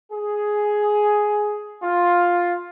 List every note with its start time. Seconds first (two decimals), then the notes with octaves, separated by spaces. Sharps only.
0.12 G#4
1.83 F4